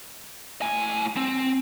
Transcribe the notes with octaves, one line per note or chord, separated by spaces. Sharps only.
A2 G#5
C4